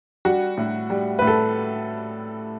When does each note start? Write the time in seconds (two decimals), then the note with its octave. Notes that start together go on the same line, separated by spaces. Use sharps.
0.25 G3 F#4
0.58 A2
0.90 G3
1.19 A2 B4
1.27 A4